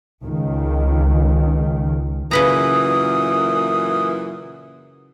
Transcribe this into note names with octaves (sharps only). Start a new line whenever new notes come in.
C#2 D#3
F#2 A#2 C#3 E3 B4 A#5 D#6